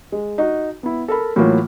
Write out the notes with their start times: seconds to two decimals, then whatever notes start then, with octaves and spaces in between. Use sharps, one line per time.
0.12 G#3
0.38 D#4 F#4
0.83 B3 E4
1.08 A4 A#4 B5
1.36 A2 E3 F#3 A#3 F4 C#5